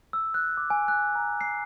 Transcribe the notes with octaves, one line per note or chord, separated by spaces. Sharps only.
E6
F#6
D6
G#5
F#6
A#5
C7